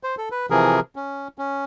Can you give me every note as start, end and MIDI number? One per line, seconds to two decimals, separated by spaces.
0.03 0.15 72
0.18 0.29 69
0.32 0.46 71
0.50 0.80 48
0.50 0.80 52
0.50 0.80 53
0.50 0.80 68
0.50 0.80 70
0.96 1.28 61
1.38 1.65 61